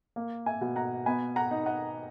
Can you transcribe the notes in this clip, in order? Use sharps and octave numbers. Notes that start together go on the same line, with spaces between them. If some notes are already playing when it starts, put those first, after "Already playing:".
A#3
E5 G#5
B2
F#5 A#5
B3 G#5 B5
F#5 A#5
D#4
D#5 F#5